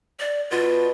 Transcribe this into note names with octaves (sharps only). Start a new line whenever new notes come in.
D5
B2 F4